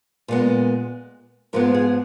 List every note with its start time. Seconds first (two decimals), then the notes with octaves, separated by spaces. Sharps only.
0.28 A#2 G#3 B3
1.53 G#2 F3 G#3 B3 A#4
1.74 G#4